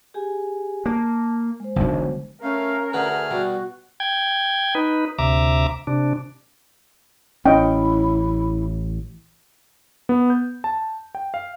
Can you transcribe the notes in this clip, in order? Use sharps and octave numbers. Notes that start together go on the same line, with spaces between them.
G4 G#4 G#5
A#3 A5
G#3 C5
E1 B1 D3 F#3
A3 C#4 A#4 F5
D3 A3 F#4 G#4 B4 F6
B2 G3 F#4
G5 G#6
D#4 B4
D2 C3 E5 A#5 D6
C3 D4
A1 C#4 E4 D#5 G5
B3
G6
A5
G5
F5